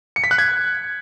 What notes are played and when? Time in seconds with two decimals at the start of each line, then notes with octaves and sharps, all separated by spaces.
0.16 C#7
0.24 B6
0.31 F#6
0.38 G#6